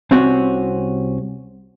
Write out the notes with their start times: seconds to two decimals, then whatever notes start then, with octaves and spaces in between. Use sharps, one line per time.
0.11 C2 C3 C4 C#4 F#4